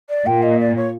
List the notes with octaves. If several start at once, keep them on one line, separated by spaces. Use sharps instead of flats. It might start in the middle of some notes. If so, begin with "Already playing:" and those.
D5
A#2 G5
D#5
D5
C#5